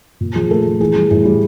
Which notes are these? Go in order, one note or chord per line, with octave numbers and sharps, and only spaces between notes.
A#2
F3 G#4
A3 A4
A3
E3 G#4
G3
A2 G#4
G3